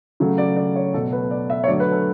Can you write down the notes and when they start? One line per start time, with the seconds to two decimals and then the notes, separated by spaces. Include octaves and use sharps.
0.20 C#3 F#3 A3
0.38 D5
0.57 D5
0.76 C#5
0.94 B2 F#3 A3 A4
1.12 B4
1.31 D5
1.50 E5
1.64 C#5
1.67 D3 F#3 A3 D5
1.80 B4
1.92 A4